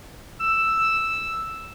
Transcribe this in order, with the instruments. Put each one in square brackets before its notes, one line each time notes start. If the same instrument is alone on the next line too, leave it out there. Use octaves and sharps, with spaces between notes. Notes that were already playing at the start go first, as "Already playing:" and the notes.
[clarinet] E6